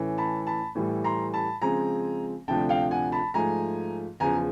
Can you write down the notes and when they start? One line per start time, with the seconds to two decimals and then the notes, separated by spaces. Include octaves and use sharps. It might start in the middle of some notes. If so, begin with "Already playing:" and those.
Already playing: A2 E3 A3 C#4
0.18 A5 B5
0.47 A5 B5
0.75 A2 E3 G3
1.04 A#5 C6
1.34 A5 B5
1.62 C#3 F3 G#3 C4 G#5 A#5
2.48 D2 C3 F3 A3 D4 G5 A5
2.69 F5 G5
2.91 F#5 G#5
3.12 A5 B5
3.34 G#2 F3 A3 G#5 A#5
4.20 E2 C#3 F3 G#5 A#5